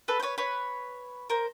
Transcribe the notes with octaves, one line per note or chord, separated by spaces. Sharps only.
A4 B4
C5
B4 C#5
B4 C#5
A#4 C5